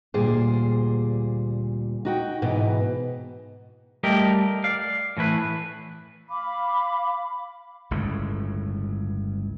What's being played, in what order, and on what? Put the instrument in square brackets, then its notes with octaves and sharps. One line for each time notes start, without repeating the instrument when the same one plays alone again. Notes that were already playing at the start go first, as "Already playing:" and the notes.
[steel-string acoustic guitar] D2 A#2 G3 G#4 C5
D#4 F#4 G5
G#2 B2 E3
[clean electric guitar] G3 A3 G4 A#4 D5 D#5
D5 F5
A2 E3 E4 B4
[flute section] F5 B5 D6
[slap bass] G1 C#2 A2 C#3